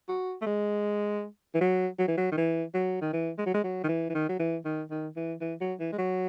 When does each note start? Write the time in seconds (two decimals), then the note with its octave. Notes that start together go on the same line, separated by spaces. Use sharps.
0.08 F#4
0.42 A3
0.46 G#3
1.54 E3
1.61 F#3
1.99 F#3
2.08 E3
2.18 F#3
2.32 D#3
2.37 E3
2.74 F#3
3.01 D#3
3.13 E3
3.38 G#3
3.46 F#3
3.54 G#3
3.64 F#3
3.84 D#3
3.88 E3
4.10 E3
4.15 D#3
4.29 F#3
4.39 E3
4.65 D#3
4.90 D#3
5.16 E3
5.41 E3
5.61 F#3
5.80 E3
5.92 G#3
5.98 F#3